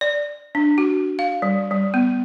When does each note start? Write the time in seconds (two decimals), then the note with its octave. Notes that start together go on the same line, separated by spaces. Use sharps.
0.01 D5
0.55 D4
0.78 F#4
1.19 F5
1.42 G3
1.71 G3
1.94 B3